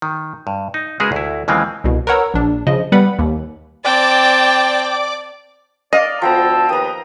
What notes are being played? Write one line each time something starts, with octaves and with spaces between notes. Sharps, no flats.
D#3
G2
D#4
C#3 G#3 F#4 G#4 A#4 B4
D2 E4
D#2 C#3 E3 F3 G#3 C4
C2 B2
A#4 B4 C#5 F#5 A#5 E6
A#1 D4
C#3 F3 D#5
G3 B3 B4 F#5 B5
D#2
C4 D5 G5 A5 D6
D5 D#5 F5
D2 F3 B3 G5 A5 A#5 E6
D#2 B4 G5 A#5 D#6